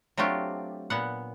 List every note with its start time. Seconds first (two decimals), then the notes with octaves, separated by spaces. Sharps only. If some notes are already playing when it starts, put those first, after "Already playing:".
0.17 F#3 A3 C4 D4 F4 G4
0.90 A#2 B3 F#5